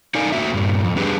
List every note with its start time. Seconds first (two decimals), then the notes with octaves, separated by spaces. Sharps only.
0.15 D#4 A4 A#4 D5 F5 G#5
0.32 A3 A#3 F#4 E5
0.54 G2 A#2
0.84 F2
0.96 E2 G3 D4 G4 G#4 B4